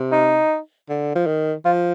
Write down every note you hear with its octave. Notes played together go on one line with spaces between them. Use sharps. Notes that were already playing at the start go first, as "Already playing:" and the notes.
Already playing: C3
D#4
D3
F3
D#3
F3 F4